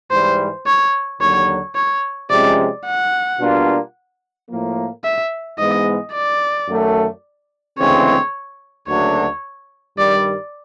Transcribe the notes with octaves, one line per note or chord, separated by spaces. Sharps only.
G#2 E3 G3 C5
C#5
D#2 D3 F#3 C#5
C#5
C3 F3 G#3 C#4 D5
F#5
B2 G3 A#3 D4 F4
A2 F3 A#3
E5
G#2 E3 G#3 B3 D#5
D5
F#2 D#3 F#3 A3
D2 C#3 E3 G#3 C4 C#5
D2 C#3 F#3 A#3 D4 C#5
G2 D#3 G3 D5